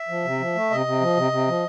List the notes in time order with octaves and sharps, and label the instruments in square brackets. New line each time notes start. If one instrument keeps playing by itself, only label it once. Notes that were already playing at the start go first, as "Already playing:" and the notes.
Already playing: [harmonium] E5
F3
C3
F3
A3
C3 D#5
C3
F3
C3
C3
F3